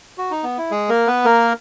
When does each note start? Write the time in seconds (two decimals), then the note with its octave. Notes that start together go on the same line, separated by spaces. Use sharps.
0.18 F#4
0.31 D#4
0.44 B3
0.58 E4
0.71 G#3 G#4
0.89 A#3 A#4
1.07 B3 B4
1.25 A#3 A#4